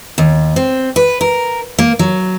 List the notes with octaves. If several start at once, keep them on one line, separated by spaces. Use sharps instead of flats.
D#2
C4
B4
A#4
A#3
F#3